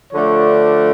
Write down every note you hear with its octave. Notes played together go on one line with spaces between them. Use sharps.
D3 F3 A3 D4 C#5